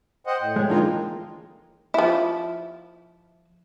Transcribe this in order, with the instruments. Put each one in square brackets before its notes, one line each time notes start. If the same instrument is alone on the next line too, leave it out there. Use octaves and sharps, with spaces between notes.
[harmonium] C5 D#5 F#5 [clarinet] G5
[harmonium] A2
[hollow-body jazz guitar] G#3 C#5
[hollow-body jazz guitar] D3 E3 D#4 [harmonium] G#3 A#3 F4
[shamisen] F3 E4